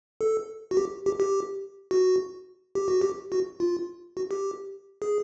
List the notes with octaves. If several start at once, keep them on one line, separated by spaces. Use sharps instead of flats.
A4
F#4
G4
G4
G4
F#4
G4
F#4
G4
F#4
F4
F#4
G4
G#4